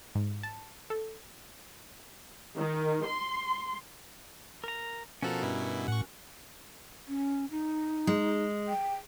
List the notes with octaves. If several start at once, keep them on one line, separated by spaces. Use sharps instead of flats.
G#2
A5
A4
D#3
C6
A#4 A#5
B2 F3 C#4 F#4 A4 A#4
G2 B2 E4
A2 F#5 C#6
C#4
D#4
G#3
G5